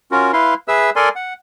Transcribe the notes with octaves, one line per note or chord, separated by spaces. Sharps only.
C#4 F4 F#4 A#4
E4 B4 F5 C6
G#4 B4 E5 E6
A4 A#4 D5 G#5 C6
F#5